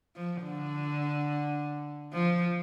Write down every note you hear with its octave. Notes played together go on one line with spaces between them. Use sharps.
F3
D3
F3